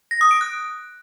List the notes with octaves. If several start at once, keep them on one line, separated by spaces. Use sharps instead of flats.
A#6
D#6
D7
F#6